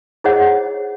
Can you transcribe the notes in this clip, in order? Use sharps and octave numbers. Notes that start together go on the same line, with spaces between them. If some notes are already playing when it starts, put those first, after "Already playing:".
E4 G#4 C5 C#5 D#5 F#5